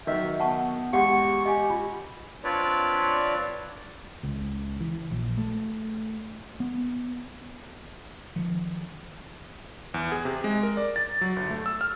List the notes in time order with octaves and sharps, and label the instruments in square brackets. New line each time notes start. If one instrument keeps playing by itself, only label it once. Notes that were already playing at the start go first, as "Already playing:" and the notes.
[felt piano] D#3 F#3 [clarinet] E5
[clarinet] B3 [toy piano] F#5 A5 C#6
[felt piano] E2 G#3 [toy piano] G4 G#4 F#5 [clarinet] C#6
[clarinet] G4 [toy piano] D#5 G#5
[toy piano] F4
[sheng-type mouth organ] C4 D4 F4 B4 C#5 D5
[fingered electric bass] C#2
E3
A#1
A3
B3
D#3 F3
[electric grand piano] E2
G#4
C3
G#3
A#4
D5
A6
F#3
G1
A3
E6
F6